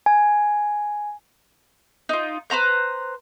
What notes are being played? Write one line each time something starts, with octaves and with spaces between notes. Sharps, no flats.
G#5
D#4 F4
B4 C5 A#5 G6